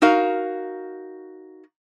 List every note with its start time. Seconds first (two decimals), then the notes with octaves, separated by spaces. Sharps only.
0.02 D#4 F#4 A#4 F5